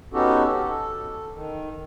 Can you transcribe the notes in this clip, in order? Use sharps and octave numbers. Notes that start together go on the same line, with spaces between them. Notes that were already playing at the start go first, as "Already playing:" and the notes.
B3 C#4 D#4 F#4 G4 A4
A4
D#3